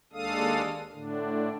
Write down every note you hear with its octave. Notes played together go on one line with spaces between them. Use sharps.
D#2 G#3 D4 A4 F5 D#6
A2 D3 D4